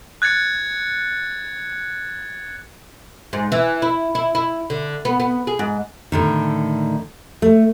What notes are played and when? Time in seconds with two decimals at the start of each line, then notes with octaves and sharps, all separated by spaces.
0.22 F#6 G#6 A6 C#7
3.33 G#2
3.52 E3
3.82 E4
4.15 E4
4.35 E4
4.70 D3
5.05 B3
5.20 B3
5.47 G#4
5.59 G#2
6.12 A2 D3 D#3
7.42 A3